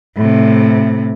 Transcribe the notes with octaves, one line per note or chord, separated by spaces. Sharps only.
A2 C3